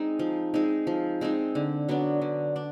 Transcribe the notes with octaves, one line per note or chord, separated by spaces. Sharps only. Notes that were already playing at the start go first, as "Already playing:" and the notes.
Already playing: G#3 C4 D#4
F3
G#3 C4 D#4
F3
G#3 C4 D#4
D3
F#3 B3 D4
D3
D4